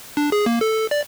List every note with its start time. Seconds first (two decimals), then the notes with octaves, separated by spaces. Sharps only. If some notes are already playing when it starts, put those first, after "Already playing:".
0.17 D4
0.32 G#4
0.46 A#3
0.61 A4
0.91 D5